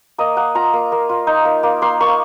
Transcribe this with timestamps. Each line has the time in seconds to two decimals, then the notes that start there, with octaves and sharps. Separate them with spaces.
0.18 A#3 D#5
0.37 A#3 F#5
0.55 F4 A#5
0.73 A#3
0.92 A#3
1.09 F4
1.27 D#4
1.45 A#3
1.63 A#3
1.82 A#3 C6
2.00 A#3 C#6